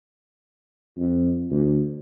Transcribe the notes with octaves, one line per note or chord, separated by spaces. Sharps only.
F2
D2